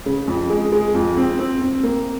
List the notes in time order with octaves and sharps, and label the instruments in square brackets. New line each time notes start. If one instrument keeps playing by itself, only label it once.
[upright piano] C#3
F2
G#3
G#3
F2
C4
C4
C4
A#3